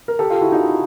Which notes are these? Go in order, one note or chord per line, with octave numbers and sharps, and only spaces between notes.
A#4
G4 A4
F4 G4
E4 F#4
D#4 F4